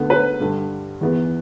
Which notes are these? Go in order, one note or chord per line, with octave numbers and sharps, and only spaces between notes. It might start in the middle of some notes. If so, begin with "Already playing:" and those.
Already playing: D2 D3 B3
B4
G2 D3 G3
E2 E3 B3